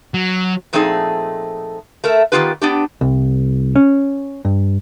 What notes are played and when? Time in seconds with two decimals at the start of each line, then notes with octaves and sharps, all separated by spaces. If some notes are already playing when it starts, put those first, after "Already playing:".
0.14 F#3
0.73 A#2 F3 A3 C4 D#4 G#4
2.04 A3 A#4 E5
2.32 D#3 E3 B3 F4 G4 B4
2.61 B3 D4 G4
3.01 C2
3.76 C#4
4.45 G2